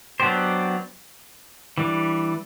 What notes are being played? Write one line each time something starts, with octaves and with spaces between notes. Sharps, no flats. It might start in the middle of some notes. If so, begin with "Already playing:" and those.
F#3 B3 D4 G4 C5
E3 G3 D4